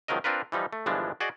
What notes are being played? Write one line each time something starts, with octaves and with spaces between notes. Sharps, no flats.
C#2 D#3 F3 F#3 A#4 D#5
C4 D4 F4 A#4 B4
E3 F3 G3 D#4
A3
G1 E3 F3 G#3 D4
F#4 G#4 D5 D#5